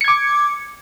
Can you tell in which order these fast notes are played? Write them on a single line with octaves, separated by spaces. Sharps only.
C#7 G#6 D6